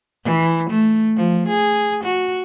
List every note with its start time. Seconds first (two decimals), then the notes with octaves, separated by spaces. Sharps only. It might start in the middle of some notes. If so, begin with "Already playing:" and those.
0.24 E3
0.70 A3
1.16 F3
1.48 G#4
2.04 F#4